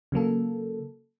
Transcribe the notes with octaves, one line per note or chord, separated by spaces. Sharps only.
C#3 F#3 A#3 A4